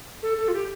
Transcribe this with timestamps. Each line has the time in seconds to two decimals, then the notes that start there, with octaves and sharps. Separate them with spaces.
0.23 A4
0.38 A4
0.48 F4
0.53 G4